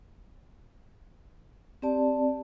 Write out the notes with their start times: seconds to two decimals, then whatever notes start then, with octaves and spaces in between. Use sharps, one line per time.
1.82 C4 G4 D5 A5